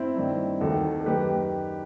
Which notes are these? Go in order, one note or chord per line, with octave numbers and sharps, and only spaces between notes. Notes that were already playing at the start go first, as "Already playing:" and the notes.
Already playing: C4 E4
G2 D#3
D#2 D#3 F#4 A4
A4
F#2 D#3 G4 B4